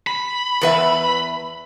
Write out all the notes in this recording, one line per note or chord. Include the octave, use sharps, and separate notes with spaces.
B5
E2 B4 E5